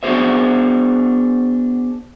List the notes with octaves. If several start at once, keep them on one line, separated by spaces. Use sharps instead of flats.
B3 D4 F#4 G#4 C5 E5